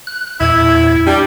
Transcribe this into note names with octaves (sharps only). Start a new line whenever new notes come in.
F#6
E2 A#2 E4 G#6
G3 D4